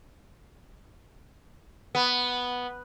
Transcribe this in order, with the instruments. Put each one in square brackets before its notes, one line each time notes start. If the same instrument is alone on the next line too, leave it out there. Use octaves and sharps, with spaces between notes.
[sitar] B3